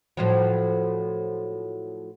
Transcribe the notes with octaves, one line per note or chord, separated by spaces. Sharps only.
A2 F3 F#3